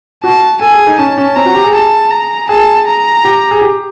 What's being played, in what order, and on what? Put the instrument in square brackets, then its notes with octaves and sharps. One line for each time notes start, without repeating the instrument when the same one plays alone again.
[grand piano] F#4 [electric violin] A5
[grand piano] A4 [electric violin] G#5
[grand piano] G#4
D#4
[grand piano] C#4 [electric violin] A5
[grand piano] C#4
[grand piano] C4 [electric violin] A#5
[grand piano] F#4
G4
G#4
[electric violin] A5
A#5
[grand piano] G#4 [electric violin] A5
[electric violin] A#5
[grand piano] G4
G#4
G4